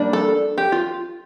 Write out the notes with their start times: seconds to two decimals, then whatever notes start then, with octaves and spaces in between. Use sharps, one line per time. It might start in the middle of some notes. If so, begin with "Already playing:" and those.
Already playing: G3 A#3 D4
0.13 A4
0.58 G4
0.72 F4